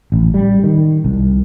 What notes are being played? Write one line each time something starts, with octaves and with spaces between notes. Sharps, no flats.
A1
G3
D#3
C2